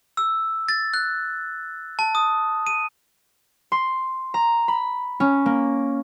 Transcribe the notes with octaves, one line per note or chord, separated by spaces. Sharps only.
E6
A6
F#6
A5
D#6
D#7
C6
A#5
B5
C#4
A#3